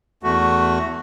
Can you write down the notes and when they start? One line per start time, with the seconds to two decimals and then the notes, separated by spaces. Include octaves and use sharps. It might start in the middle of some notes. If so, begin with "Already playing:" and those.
0.23 E2 A3 F#4